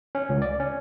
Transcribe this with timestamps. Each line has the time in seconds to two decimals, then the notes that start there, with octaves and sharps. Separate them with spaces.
0.15 C#4
0.29 C#2
0.42 D5
0.60 C#4